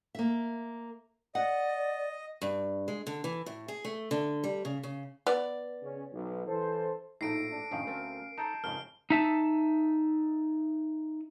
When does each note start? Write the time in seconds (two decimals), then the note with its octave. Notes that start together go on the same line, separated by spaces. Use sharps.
0.15 A#3 E5
1.35 D5 D#5 F#5
2.42 G2
2.88 G#3
3.07 D3
3.24 E3
3.46 A2
3.68 G#4
3.85 A3
4.11 D3
4.44 G3
4.65 C#3
4.83 C#3
5.27 B3 D5
5.83 C#3 C#4
6.12 B1
6.47 E3 A4 C5
7.21 A#1 A2 D#4 A4 A#6 C7 D7
7.52 D4
7.71 F2 A2 D#3 C#4 F5
7.87 D2 A3 C4 A#4
8.38 D#4 A4 C5 A5 A#5 G6
8.64 F2 G#2 C#3 A#4 F6
9.10 D#4 E5 A5